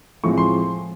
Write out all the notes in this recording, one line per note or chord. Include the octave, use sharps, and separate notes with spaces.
A2 F3 G#3 C4 C#6
C6